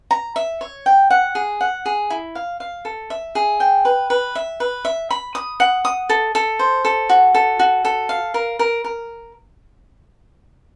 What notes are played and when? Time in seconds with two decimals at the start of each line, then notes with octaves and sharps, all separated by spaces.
0.11 A#5
0.36 E5
0.61 C#5
0.86 G5
1.10 F#5
1.35 G#4
1.61 F#5
1.86 G#4
2.10 E4
2.35 F5
2.60 F5
2.85 A4
3.10 E5
3.35 G#4
3.60 G5
3.85 B4
4.10 B4
4.35 E5
4.60 B4
4.85 E5
5.10 B5
5.35 D#6
5.60 F#5
5.85 D#6
6.10 A4
6.35 A4
6.59 C5
6.85 A4
7.10 F#4
7.34 A4
7.59 F#4
7.85 A4
8.09 F5
8.34 A#4
8.59 A#4
8.84 A#4